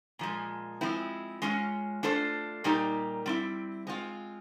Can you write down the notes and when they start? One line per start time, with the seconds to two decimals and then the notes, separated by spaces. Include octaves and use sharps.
0.19 A#2 F3 G#3
0.81 F3 G#3 C4 E4
1.42 G#3 C#4 F4
2.03 A3 D4 F4 A4 C5
2.64 A#2 G3 A#3 D#4 G4
3.26 G3 C4 E4
3.87 G#3 C4 F4